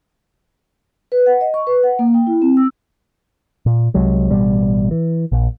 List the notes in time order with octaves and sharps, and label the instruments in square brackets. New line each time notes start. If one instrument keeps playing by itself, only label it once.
[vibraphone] B4
F#5
D#5
C#6
B4
F#5
A#3
G5
E4
C4
E6
[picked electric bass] A#2
C2 C3 F#3 G#3
A1 B2 G3
E3
A#1